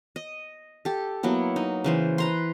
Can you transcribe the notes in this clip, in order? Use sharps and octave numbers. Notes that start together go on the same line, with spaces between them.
D#5
G4 A4
F#3 A#3 B3 E4
D#4
C#3 E3 C5
B4 A#5 C6